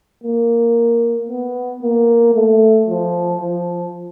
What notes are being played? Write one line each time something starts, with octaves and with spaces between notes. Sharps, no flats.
A#3
B3
A#3
A3
F3
F3